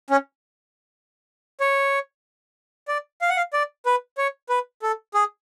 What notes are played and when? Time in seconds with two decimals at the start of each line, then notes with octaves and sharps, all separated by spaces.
0.10 C#4
1.60 C#5
2.88 D5
3.21 F5
3.29 F#5
3.37 F5
3.53 D5
3.86 B4
4.18 C#5
4.49 B4
4.82 A4
5.14 G#4